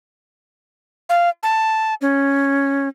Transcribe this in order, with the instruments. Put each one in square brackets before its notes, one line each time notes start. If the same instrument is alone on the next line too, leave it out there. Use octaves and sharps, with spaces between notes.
[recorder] F5
A5
C#4